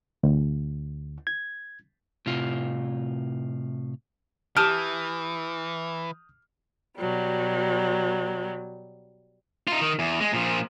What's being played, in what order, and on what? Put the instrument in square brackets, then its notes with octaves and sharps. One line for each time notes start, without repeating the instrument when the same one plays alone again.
[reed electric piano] D2
G#6
[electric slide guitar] A2 C3 F4
[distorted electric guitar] E3 [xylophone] G4 A5 D7 [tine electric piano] D#6 G6 [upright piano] F6
[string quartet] B2 F#3 G3
[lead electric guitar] D#4 F4
D#3
E2
G#3
A#2 F3